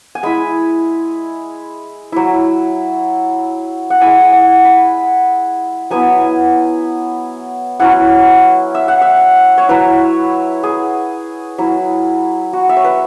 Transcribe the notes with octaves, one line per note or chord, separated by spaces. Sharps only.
G#5
G#3 E4 B5
F#3 E4
F#5
G#3 E4 G#5
F#5
B5
F#3 B3 E4 G#5
F#3 C#4 E4 F#5
E5
F#5
E5
C#5
F#3 E4 B4
G#4
F#3 E4
F#4
E5
C#5
B4